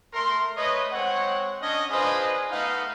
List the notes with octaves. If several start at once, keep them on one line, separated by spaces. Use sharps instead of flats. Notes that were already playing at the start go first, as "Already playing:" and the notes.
A3 A#4 C6
A3 B4 C#5 D#5
G#3 C4 C#5 F#5
C#4 D4 D#5
D4 F4 G#4 B4 C5 D#5
A3 B3 D#4 F5